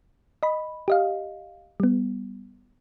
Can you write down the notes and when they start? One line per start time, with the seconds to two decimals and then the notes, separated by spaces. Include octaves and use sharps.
0.43 D#5 B5
0.88 G4 D#5 F5
1.80 G3 B3